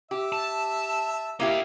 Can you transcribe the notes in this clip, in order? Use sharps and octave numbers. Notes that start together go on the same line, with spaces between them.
G4 E5
A5
A#3 D#4 E4 G4 F5